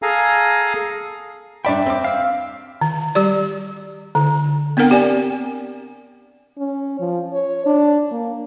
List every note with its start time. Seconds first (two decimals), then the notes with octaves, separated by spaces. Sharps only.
0.02 G#4 A4 F5 G#5 A#5
1.65 G2 D5 E5 G5 B5
1.86 C4 D6
2.04 F5 E6
2.82 D#3
3.15 G3 G4 D5
4.15 D3
4.77 B3 C4 D4 A#4 F#5 G5
4.91 G4 D5 G#5
6.58 C#4
7.00 F3
7.33 C#5
7.66 D4
8.11 A#3